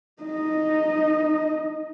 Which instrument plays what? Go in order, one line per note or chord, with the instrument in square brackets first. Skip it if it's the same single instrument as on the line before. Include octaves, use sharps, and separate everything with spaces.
[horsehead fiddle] D#4 D#5